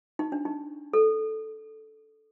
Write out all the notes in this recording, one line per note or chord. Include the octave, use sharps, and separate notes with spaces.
D#4
D4
D#4
A4